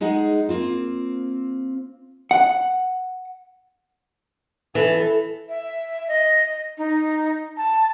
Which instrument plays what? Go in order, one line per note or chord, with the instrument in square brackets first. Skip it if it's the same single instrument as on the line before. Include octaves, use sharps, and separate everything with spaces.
[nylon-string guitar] G#3 D#4 G#4 D#5 F#5
A#3 C4 F4
[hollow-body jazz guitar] F#5
[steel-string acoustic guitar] E3 [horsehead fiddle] A4
[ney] E5
D#5
D#4
A5